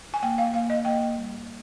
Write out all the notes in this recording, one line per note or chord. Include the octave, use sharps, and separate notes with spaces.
G#5
A#3 G5
F5
A#3 F5
D#5
A#3 G5
G3